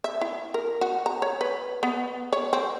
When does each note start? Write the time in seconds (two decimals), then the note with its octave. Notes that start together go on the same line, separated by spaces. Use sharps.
0.04 E5
0.21 E4
0.54 A#4
0.81 F#4
1.06 A#5
1.22 C#5
1.41 B4
1.83 B3
2.33 C#5
2.53 C4